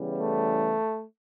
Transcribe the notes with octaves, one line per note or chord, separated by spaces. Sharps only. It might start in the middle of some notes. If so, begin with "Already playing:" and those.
Already playing: E2 C#3 E3 G3
A3